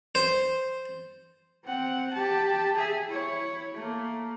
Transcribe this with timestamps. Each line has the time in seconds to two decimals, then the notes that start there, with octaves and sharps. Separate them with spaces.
0.15 C5
1.65 C4 F#5
2.13 G4 A5
2.76 G#4 E5
3.09 E4 C#5
3.74 A3 A#3